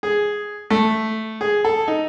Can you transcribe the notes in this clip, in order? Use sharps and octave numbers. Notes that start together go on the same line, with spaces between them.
G#4
A3
G#4
A4
D#4